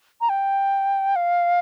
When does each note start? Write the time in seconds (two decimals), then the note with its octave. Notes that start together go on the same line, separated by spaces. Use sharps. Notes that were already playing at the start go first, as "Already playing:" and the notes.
0.21 A#5
0.29 G5
1.16 F5